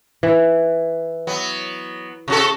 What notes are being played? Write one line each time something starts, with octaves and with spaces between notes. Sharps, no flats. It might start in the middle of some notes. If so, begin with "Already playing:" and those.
E3
F#3 B3
C3 F#4 A4